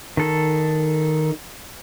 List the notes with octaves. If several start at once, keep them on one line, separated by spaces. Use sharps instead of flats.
D#3 A4